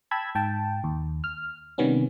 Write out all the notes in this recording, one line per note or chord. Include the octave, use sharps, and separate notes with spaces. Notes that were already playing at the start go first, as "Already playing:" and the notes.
G5 A5 B5 E6 G#6
G#2 G5 A5
D#2
F6
C3 D#3 G3 B3 C#4